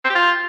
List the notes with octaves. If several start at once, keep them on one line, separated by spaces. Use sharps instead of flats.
C4
G4
F4